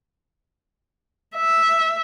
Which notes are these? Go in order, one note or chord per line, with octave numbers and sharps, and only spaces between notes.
E5